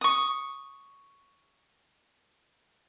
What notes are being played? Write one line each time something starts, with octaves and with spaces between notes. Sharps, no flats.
C#6 D#6